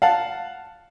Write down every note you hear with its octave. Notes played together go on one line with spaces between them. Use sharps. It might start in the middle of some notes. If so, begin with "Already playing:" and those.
F5 F#5 A5